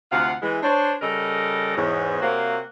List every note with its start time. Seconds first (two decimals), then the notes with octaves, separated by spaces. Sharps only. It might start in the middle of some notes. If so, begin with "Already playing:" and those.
0.11 D2 C3 F4 F5 F#5
0.42 E3 G#3
0.63 D4 C5 C#5
1.01 C#3 G3 A4 A#4 D#5
1.75 E2 G#2 C#5
2.21 C3 A#3 C4 F#4 C#5 F5